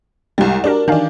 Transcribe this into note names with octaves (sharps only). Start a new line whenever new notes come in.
C2 G3 G#3
D4 F#4 G4 A#4
D#3 E3 D4 F5 G#5